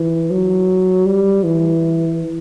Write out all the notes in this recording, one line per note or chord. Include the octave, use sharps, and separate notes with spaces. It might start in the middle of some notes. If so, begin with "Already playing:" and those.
Already playing: E3
F#3
G3
E3